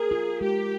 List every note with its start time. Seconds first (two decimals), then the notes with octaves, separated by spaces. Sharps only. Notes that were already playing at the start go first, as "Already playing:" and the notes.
Already playing: G#4 A#4
0.11 F4
0.41 G#3 G4